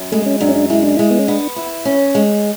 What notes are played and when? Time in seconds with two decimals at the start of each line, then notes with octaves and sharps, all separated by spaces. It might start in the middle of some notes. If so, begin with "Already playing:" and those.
Already playing: F#2
0.12 G#3 A3
0.26 C#4
0.41 F#2 D4
0.49 C#4
0.56 D4
0.70 G#3 E4
0.83 D4
0.97 G#3 E4
1.11 B3
1.19 C#4
1.27 B3 D4
1.56 E4
1.85 C#4
2.15 G#3